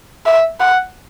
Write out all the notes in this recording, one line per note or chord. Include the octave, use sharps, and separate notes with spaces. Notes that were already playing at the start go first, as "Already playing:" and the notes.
E5
F#5